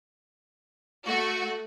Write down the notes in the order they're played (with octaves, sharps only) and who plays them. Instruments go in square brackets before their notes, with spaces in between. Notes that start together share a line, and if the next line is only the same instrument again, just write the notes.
[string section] A3 F#4 [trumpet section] C#6